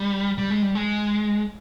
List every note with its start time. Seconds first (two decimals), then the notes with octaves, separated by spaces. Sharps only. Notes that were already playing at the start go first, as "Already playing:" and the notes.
Already playing: G3
0.38 G3
0.50 G#3
0.62 G3
0.75 G#3